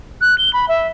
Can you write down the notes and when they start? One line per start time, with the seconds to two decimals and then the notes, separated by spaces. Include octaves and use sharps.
0.21 F#6
0.38 G7
0.53 B5
0.68 E5